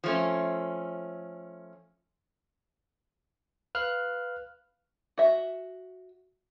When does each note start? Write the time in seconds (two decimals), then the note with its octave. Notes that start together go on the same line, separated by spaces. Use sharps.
0.04 F3 A3 C#4
3.75 B4 F5 F6 F#6
5.18 F#4 E5